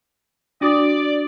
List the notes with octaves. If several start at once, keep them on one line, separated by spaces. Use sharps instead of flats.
D4 F#4 D5 D#6